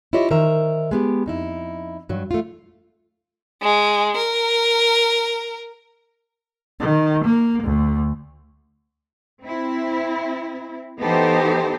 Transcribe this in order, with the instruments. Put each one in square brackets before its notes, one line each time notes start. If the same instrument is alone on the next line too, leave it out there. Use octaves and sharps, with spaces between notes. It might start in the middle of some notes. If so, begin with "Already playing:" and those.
[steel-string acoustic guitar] E4 F4 G4 C#5 D#5 E5
D#3 A#4 C5 E5 A#5
G#3 B3 G4
F2 D#4 E4
G2 F#3
A3 F4
[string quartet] G#3
A#4
[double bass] D#3
A#3
D2
[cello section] C4 E4
E3 B3 D#4 G4 A4 C5